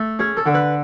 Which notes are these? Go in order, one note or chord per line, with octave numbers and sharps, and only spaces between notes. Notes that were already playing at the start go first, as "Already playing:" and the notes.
Already playing: A3
C#4 G#4
A4
D3
B4